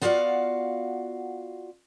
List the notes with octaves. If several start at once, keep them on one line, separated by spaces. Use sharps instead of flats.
B3 F4 F#4 D5 F5 F#5